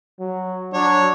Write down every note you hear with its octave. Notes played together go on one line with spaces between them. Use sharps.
F#3
F#3 D4 C#5